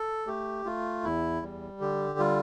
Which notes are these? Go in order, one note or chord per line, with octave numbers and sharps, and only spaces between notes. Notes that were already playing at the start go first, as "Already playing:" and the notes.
Already playing: A4
A3 G4
A3 F4
E2 E4
G3
D3 G4
G3 F4